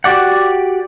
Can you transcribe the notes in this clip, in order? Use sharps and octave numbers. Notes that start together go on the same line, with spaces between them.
F#4 G4 D5 F#5